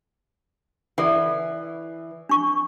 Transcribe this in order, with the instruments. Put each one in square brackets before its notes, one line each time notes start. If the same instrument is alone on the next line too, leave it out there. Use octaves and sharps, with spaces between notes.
[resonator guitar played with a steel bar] E3 [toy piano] A4 D5 F#5
[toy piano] D4 C#6